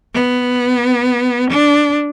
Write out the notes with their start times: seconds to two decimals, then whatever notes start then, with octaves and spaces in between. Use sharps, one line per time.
0.14 B3
1.51 D4